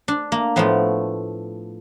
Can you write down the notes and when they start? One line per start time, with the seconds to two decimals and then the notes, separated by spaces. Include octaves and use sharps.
0.08 D4
0.32 A#3
0.56 A2 F3 A3 B3